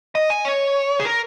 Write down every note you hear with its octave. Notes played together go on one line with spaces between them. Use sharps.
D#5
G#5
C#5
G#4
A#4